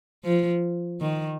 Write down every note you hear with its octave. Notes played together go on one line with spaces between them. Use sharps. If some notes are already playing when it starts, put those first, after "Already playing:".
F3
D#3